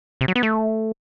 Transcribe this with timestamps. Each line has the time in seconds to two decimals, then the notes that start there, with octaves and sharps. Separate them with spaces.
0.21 C3
0.28 F#3
0.35 B3
0.43 A3